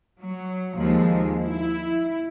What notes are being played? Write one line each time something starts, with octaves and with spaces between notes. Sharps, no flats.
F#3
D#2 F3 G#3
E4